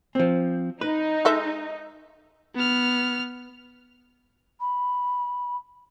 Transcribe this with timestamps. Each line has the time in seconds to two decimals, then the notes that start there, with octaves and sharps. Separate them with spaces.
0.15 F3 C4
0.81 D#4 B4
1.25 G#3 A4 E5
2.55 B3 F6
4.60 B5